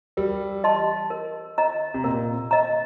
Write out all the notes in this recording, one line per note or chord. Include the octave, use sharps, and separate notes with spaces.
G3 A#4
D#5 A5 C6
A#4
D#5 A#5
C3
A#2 A#4
D#5 A#5